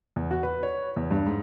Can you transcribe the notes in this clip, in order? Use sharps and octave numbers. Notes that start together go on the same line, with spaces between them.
E2
F#4
B4
C#5
E2
G2
G#2